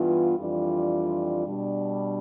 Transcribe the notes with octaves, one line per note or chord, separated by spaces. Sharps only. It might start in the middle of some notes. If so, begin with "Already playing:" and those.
Already playing: G2 E3 B3 F4
F2 E3 G3 D4 F4
B2 G3 D4